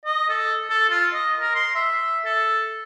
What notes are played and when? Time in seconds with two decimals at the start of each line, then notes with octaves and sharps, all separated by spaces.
0.05 D#5
0.29 A4
0.70 A4
0.90 F4
1.14 D#5
1.41 A#4
1.55 C6
1.75 E5
2.25 A4